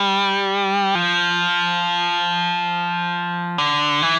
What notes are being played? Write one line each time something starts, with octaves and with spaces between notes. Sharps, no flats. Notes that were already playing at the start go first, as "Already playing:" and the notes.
Already playing: G3
F3
D3
E3